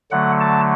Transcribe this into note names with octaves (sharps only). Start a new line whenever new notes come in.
D3 F#3 A3 F#5
A5